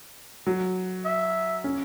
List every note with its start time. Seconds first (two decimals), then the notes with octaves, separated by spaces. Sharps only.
0.47 F#3
1.05 E5
1.64 C#4